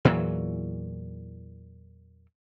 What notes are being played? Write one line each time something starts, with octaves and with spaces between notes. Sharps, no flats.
E2 A#2 E3 F#3